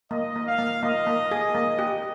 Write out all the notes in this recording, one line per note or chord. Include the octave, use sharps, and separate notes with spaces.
A#3 D#5
A#3
F5
A#3
A#3 D#5
A#3
G#4
A#3
G4